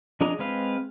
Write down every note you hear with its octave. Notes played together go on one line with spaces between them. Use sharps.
F3 D4 G#4 D#5 A#5
G#3 C4 B4 F5